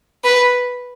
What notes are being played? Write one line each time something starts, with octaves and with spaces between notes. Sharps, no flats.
B4